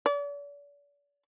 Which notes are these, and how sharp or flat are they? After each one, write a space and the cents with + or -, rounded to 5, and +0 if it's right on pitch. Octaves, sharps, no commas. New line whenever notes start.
D5 -40